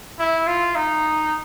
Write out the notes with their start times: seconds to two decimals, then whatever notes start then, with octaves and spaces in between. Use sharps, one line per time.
0.19 E4
0.47 F4
0.75 D#4